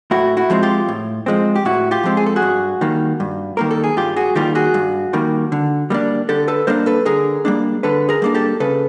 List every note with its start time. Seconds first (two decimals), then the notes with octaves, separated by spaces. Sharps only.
0.11 A2 E4 F#4
0.37 E4 F#4
0.50 F3 G#3 C4
0.63 F4 G4
0.88 A2
1.26 F3 G#3 C4
1.56 G4
1.65 A2 E4 F#4
1.91 F4 G4
2.04 F3 G#3 C4
2.17 G#4
2.26 A4
2.36 F#4 G#4
2.42 G2
2.81 D#3 G3 A#3
3.20 G2
3.57 D#3 G3 A#3 A#4
3.71 A4
3.84 G#4
3.97 G2 F4 G4
4.16 F#4 G#4
4.35 D#3 G3 A#3 F4 G4
4.55 F#4 G#4
4.74 G2
5.13 D#3 G3 A#3
5.52 D3
5.90 G3 A#3 D4
6.29 D3 G4 A4
6.48 A4 B4
6.67 G3 A#3 D4 A#4 C5
6.86 A4 B4
7.05 D3 G#4 A#4
7.45 G3 A#3 D4
7.83 D3 A4 B4
8.09 G#4 A#4
8.22 G3 A#3 D4
8.34 G4 A4
8.60 C#3 A4 B4